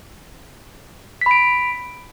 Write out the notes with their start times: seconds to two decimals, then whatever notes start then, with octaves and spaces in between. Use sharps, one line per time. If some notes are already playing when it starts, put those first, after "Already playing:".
1.21 B6
1.26 B5
1.31 D7